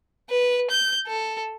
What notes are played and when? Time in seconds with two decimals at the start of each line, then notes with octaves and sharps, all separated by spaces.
0.30 B4
0.71 G6
1.07 A4